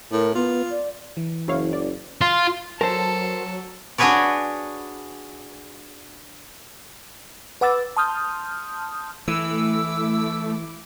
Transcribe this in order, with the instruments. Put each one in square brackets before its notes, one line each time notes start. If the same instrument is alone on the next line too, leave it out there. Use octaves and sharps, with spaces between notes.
[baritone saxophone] A2 [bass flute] A#4
[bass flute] B3 [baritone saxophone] F4
[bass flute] D5
[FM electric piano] E3
[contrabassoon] F#1 [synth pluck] E4 C#5 F5
[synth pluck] D5
[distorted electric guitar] F4
[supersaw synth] F#3 [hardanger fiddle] A4 [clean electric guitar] A#4 C5 [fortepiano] A5
[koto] D4 F#4 G#4 B4 C#5 D5
[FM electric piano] B4 F#5 D6 E6 A6
A5 C6 D#6 F6 G6
[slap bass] E3 [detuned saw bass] A3 [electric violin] E4 D6 [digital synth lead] E6